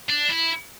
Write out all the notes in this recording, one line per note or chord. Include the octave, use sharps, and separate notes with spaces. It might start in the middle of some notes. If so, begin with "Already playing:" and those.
D4
E4